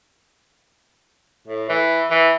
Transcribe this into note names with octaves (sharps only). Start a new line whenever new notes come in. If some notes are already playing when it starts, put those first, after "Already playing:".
A2
E3
E3